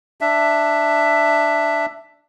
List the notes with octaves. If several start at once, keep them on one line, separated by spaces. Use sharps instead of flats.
D4 E5